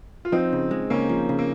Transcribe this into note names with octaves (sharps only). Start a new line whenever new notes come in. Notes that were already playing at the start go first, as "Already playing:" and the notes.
F4
F3 C4 D#4
C#3
G#3
C#3 A#3 C#4
F3
C#3
A#3